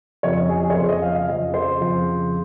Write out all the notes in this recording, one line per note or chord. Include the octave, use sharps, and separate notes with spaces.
F2 C#3 F3 C#5
D#5
G#4
G#4
C#5
F2 C#3 F3 C5
D#5
F5
F5
F2 C#3 F3 D#5
C5
F2 C#3 F3